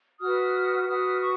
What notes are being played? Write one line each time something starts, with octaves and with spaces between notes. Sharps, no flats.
F#4 B4 D#6 F6
F#4 B4 D#6 F6
C#6 D#6